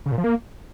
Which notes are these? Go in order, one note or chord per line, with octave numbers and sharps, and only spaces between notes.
C#3
A#2
F3
A#3